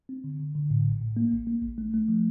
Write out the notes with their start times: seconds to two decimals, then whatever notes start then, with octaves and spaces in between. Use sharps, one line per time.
0.09 C4
0.24 D3
0.39 D3
0.55 D3
0.70 A2
0.85 A1
1.02 A2
1.17 A#3
1.32 A1
1.47 A#3
1.63 A1
1.78 A3
1.94 A3
2.08 F3